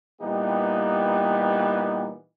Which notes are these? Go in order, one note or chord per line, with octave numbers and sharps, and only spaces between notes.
A#2 E3 G3 B3 D#4 G4